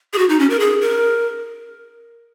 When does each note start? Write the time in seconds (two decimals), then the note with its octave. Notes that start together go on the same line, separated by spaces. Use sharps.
0.13 G#4
0.18 F#4
0.29 D#4
0.39 C#4
0.50 A#4
0.60 G#4
0.81 A#4